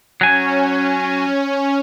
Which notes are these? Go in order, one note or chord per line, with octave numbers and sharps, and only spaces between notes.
F#3 C#4 G#5